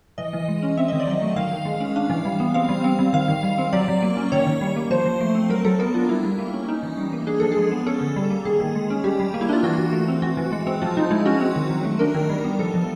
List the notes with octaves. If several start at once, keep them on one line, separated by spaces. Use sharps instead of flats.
E3 D#5
E3
G#3
C#4
C4 E5
D#3 D#5
D5
F#3 D#5
A3
D#3 F5
D#3
G#3
C#4
D4 F5
E3
G3
B3
C4 F5
G3
C4
G3
D#3 F5
D#3
G3
C4
F#3 D5
F#3
A#3
C#4
D#3 C#5
D#3
G3
A#3
F3 C5
F3
A3
C4
F#3 A#4
F#3 A4
B3 A#4
D4 F4
G3 E4
G3
A#3
C#4
C#4 D#4
E3
G3
A#3
D4 G#4
F3 A4
G#4
G#3
B3
C#4 A4
D3
G3
A#3
D#3 G#4
D#3
G#3
C#4
G3 G4
G3
A#3
E4
D4 F4
E3 F#4
E3
A3
C4
E3 F#4
E3
G#3
C4
F3 F4
F3 D#4
G#3 E4
C#4 F#4
C4
D#3
F#3
A3
D4 A#4
D#3
G3
B3
F3 A4
F3